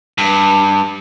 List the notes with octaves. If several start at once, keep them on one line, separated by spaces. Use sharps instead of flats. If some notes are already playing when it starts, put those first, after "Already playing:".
G2